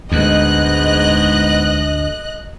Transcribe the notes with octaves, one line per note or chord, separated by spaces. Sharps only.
D2 G#2 B3 D#5 F#6